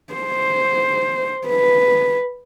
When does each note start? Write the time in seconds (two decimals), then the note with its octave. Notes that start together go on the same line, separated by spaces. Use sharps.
0.14 C5
1.48 B4